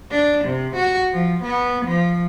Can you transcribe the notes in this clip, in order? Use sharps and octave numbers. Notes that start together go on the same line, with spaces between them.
D4
C3
F#4
F3
B3
F3